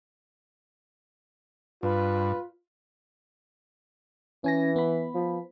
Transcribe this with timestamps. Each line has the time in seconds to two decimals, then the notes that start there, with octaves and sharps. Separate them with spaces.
1.83 G2 F4 B4
4.44 E3 C#4 G#5 A#6
4.76 B3 B5
5.15 F3